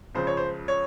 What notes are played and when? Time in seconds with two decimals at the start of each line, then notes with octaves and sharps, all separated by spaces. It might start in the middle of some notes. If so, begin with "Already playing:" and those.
0.15 C#2 C#3 F3 C5
0.27 C#5
0.37 C5
0.68 C#5